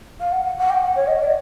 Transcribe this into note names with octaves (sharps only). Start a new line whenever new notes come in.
F5
F#5
F#5
F#5
G5
F#5
C#5
D#5
D5